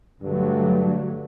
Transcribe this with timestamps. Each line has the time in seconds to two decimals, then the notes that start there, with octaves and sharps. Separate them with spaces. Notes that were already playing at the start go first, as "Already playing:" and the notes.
0.23 G2 D3 F#3 A3